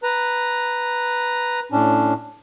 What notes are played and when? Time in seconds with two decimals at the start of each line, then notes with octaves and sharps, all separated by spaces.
0.03 B4 A#5
1.72 A2 C#4 D4